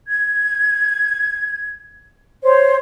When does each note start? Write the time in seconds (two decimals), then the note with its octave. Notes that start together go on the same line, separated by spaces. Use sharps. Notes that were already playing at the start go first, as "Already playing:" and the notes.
0.06 G#6
2.42 C5 C#5